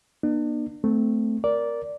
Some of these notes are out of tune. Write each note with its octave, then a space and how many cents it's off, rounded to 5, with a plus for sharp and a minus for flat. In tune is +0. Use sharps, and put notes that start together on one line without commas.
A#3 +40 D4 +40
A3 +0 C4 -20
A#4 +5 D5 -10